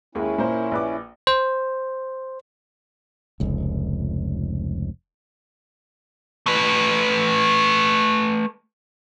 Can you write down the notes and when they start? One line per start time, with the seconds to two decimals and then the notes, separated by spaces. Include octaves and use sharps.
0.15 D#2 G#3 C#4 E4
0.38 A#2 A#4 C5
0.71 A#1 B4 D6
1.27 C5
3.40 F1 C#2
6.46 A3 B4